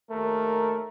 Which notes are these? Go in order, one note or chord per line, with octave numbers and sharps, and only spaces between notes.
D#2 A3 A#4